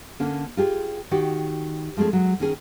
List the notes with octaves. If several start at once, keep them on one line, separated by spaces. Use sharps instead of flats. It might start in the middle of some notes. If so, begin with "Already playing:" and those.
D3 A#3 C#4
F4 G4 G#4
D#3 F#4 G4
F3 G#3 A3 C4 G#4
F#3 G#3
D#3 C#4 G#4